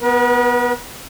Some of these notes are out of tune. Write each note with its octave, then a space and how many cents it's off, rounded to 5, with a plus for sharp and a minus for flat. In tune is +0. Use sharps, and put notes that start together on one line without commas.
B3 +0 B4 -45